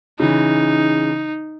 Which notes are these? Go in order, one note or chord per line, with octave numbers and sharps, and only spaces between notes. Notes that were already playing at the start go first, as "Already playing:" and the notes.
C#3 E3 D#4